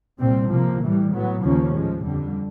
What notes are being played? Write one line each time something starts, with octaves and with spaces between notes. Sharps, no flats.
C2 A#2 G3 C4
C3 F3 A#3
A2 E3 G3
A2 F#3 B3
D#2 C#3 F3 A#3 C#4
A2 F3 G#3
F2 D3 G3